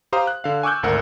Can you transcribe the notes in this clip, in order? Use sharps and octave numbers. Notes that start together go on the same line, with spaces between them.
G4 C5 F5 A#5 D#6
F#6
D3 F5
G#5 C#6 D6 E6 F#6 G6
G#1 D2 A#4 F#5 E6